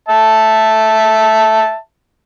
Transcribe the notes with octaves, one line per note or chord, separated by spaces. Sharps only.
E5 A5